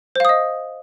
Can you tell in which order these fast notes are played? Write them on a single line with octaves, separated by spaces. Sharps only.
C5 F5 D#6 D#5